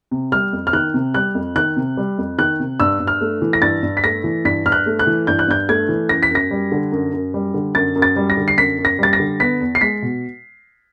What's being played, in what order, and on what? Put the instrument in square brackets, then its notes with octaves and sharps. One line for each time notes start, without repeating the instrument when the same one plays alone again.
[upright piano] C3
G3 F6
F2
F6
D#3 F#6
C3
G3 F#6
F2
D#3 F#6
C3
G3
F2
D#3 F#6
C3
G2 E6
G2
F6
A3
E3
A#6
G2 A6
G2
B6
A3 A#6
E3
G2 B6
G2 F6
F#6
A3
F#6
E3
G2 G6
F#6
G2 G6
A3 G#6
E3
F#2 A#6
B6
F#2 A#6
G3
D3
F#2
F#2
G3
D3
F#2 A6
F#2
A6
G3
A#6
D3
C7
F#2 B6
F#2
A#6
G3 A6
A#6
D3
B3 B6
E2
C7
G#3 B6
B2